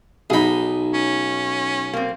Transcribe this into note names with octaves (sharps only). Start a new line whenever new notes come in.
B1 D#4 G#4 B5
C#4
A#3 C4